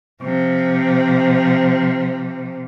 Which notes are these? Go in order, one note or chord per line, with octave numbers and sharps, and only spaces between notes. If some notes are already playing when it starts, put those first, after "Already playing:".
C3 F3